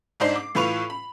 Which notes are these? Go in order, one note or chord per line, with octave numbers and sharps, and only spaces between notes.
G#2 D4 D#4 C5 C7
D6
A2 E3 F4 B4 C#6 F7
B5